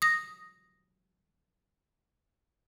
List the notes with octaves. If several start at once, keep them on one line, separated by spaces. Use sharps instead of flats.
D#6 A#6